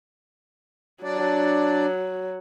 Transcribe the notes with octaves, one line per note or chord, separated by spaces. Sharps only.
F#3 D4 D5